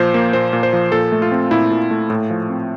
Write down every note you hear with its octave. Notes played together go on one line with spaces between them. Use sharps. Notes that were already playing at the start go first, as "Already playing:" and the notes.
Already playing: A#2 F3 C5
A#3
A#2 C5
A#2
C5
F3
A#2 A4
A3
F4
C4
A#2 E4
A#2
A3
A2
F3
C4